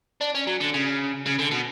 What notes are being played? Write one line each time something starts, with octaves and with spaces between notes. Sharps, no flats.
D4
C#4
F#3
D3
C#3
C#3
D3
B2